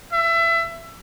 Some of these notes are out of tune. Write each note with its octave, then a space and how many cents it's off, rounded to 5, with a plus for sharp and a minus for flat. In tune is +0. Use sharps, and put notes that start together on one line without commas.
E5 +25